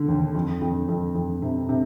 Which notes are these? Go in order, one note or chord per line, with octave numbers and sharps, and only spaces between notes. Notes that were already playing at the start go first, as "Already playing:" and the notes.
Already playing: D3
D#2
F2
F2
F2
F2
C3
C3